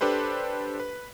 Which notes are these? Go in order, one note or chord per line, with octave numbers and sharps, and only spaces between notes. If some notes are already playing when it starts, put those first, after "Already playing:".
D4 G4 A4 B4 C5
B4